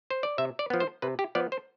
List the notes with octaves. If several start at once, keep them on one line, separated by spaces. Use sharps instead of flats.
C5
D5
C3 E5
D5
F3 B3
C5
C3 B4
G4
F3 B3 D5
C5